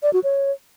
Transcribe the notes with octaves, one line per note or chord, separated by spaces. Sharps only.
D5
F#4
C#5